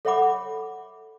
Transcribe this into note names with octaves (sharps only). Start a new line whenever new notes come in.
A4 C#5 E5 F#5 B5 D6